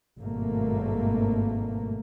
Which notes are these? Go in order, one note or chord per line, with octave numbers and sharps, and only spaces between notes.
G#1 G2 B2 A3 A#3